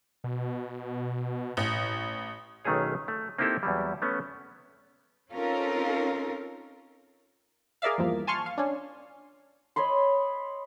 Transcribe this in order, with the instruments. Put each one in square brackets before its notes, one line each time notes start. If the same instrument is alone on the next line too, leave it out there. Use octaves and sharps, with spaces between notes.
[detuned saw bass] B2
[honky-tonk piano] A1
[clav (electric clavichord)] B1 D#3 A3 C#4 G#4 C#5
A3
A#3 C4 D#4 E4 G4 A4
E2 F#3 G3
A3 B3 C#4
[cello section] C4 C#4 D#4 F4 A4 A#4
[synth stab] G#4 A#4 D5 E5 F5
E2 G2 F3 A#3
G#5 A5 C6 C#6 F6
F5
C#4 D4
[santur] C#5 D#5 B5 C6